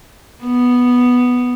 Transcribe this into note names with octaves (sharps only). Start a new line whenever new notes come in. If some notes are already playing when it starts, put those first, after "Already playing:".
B3